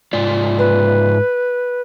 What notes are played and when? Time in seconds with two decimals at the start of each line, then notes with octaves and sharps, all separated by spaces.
0.13 G#2 F4 D5
0.59 B4